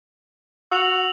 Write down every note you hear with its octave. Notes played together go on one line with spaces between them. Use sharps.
F#4 E6 F7 F#7